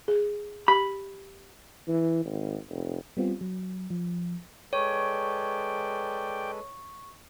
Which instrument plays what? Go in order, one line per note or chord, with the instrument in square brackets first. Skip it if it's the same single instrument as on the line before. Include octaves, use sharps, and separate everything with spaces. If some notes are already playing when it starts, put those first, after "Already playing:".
[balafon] G#4
[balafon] G4 [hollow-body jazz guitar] B5
[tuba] E3
G#1
F1
[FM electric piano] G3 B3 C4 F4
F#3
F3
[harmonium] G#3 A4 B4 [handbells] C#5 [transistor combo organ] D5 G5 [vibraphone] C#6